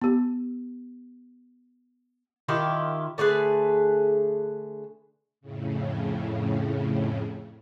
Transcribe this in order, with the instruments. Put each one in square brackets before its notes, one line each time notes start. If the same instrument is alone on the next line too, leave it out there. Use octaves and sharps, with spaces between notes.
[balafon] B3 G4
[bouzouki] D#3 E4 F4 G4
D3 A3 G#4 B4
[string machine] F2 A2 C#3